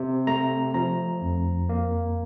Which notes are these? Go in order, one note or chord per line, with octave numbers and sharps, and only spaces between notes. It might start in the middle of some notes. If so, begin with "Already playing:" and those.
Already playing: C3
A3 A#5
F3 A#5
F2
A#3